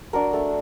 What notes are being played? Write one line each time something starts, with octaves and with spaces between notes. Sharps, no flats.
D4 F#4 A#4
A3